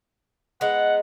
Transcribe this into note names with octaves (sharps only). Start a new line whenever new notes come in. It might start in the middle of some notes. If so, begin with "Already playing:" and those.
G#3 B3 D#4 F#5